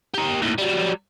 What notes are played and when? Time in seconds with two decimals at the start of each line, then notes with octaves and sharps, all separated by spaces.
0.14 G4 A#4
0.42 D#2 A2
0.58 F#3 G3